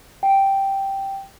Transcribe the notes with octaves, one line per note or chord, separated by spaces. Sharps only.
G5